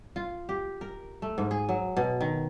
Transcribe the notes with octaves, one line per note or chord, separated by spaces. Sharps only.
F4
G4
A#4
A3
G#2
G#4
F#3
B2
D#3